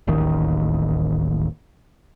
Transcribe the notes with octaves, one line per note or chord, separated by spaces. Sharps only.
D1 A1 D#2 D#3